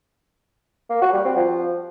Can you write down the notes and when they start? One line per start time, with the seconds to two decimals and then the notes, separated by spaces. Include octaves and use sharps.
0.90 A#3
1.01 F#4
1.13 G3
1.25 C4
1.36 F3